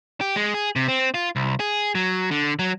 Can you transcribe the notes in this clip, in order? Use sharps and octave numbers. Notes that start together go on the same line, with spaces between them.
G4
G#3
G#4
C3
C4
F4
C2
G#4
F#3
D3
F#3